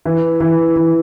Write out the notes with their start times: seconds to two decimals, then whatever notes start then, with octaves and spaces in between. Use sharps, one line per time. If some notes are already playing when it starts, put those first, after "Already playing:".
0.06 E3
0.40 E3
0.76 E3